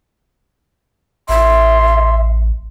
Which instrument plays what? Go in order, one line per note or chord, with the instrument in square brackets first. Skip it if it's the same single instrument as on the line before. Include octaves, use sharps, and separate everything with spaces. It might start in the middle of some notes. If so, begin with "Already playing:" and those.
[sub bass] A1 [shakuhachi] E5 [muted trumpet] C6